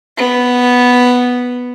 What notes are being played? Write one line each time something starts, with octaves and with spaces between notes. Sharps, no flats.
B3